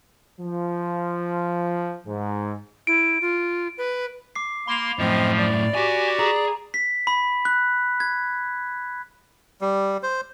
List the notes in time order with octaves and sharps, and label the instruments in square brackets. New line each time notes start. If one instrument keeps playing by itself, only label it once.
[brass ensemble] F3
G#2
[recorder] E4 [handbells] D7
[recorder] F4
B4
[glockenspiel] D6 C7
[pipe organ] A#3 C6 [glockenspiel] B5 F7
[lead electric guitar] F#2 A2 [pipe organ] F3 [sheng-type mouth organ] C4 D#5
[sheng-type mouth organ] D5
[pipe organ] F#4 G4 [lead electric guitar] G#5
[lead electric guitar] G#4 [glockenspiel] A#5
[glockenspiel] B6
B5
F#6
G#6
[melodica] G3
C5